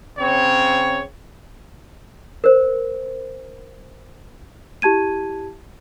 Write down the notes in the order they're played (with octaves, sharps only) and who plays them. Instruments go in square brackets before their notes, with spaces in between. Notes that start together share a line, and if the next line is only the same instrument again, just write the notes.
[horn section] C#3 C4 C#5
[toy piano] A#4 C5
[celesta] E4 G4 A5 G#6 D#7